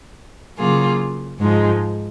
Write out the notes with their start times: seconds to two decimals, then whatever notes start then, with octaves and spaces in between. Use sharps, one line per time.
0.58 C#3 F#3 A#3 F4 G#4
1.39 G#2 F3 G#3 D#4